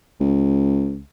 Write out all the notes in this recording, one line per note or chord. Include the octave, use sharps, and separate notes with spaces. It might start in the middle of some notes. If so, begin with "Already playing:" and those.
C#2